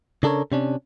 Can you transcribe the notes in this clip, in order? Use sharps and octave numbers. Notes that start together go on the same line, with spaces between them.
C#3 D4 A4 A#4 C#5
C3 C#4 D4